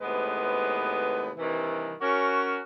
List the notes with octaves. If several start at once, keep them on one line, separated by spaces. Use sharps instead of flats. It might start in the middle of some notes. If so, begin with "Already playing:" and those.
D#2 A2 C3 G#3 B3 B4
G2 C3 D#3 E3
C#4 F#4 A#4